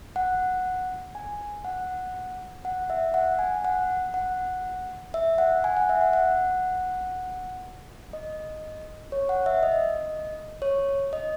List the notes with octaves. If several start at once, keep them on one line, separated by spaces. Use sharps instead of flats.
F#5
G#5
F#5
F#5
E5
F#5
G#5
F#5
F#5
E5
F#5
G#5
F#5
E5
F#5
F#5
D#5
C#5
F#5
E5
D#5
C#5
D#5